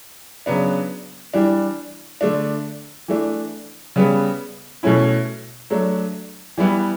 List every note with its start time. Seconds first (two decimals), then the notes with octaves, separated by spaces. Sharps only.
0.46 C#3 F#3 B3 D4
1.34 E3 G3 D4
2.21 D3 A3 D4
3.08 E3 A3 D4
3.96 C#3 G3 B3
4.83 B2 A3 C#4 E4
5.70 F#3 A3 D4
6.58 E3 G3 B3 E4